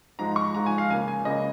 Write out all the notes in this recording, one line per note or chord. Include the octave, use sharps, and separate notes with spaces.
G#2 F3 G#3 A#5
C#6
G#2 F3 G#3 A#5
G#5
F5
C#2 C#3 A#3 G#5
G#5
C#2 C#3 A#3 D#5